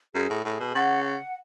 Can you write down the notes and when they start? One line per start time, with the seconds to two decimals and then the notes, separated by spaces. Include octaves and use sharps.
0.15 F#2 G#4
0.30 A2
0.44 A2 G#4
0.60 B2
0.74 C#3 F#5
1.04 F#5